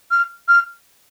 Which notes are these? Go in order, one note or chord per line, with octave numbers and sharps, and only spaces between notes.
F6
F6